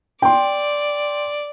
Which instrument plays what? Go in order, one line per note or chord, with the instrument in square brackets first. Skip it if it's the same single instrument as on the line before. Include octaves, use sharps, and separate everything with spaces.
[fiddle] D5 [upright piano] G5 C6